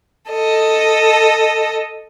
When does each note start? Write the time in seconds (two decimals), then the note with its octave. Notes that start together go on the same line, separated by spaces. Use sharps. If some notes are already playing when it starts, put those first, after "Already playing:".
0.31 A4 D#5